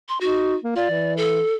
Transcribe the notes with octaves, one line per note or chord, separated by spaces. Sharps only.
C6
D#4 F#4
A#3
F4 D5
E3
A4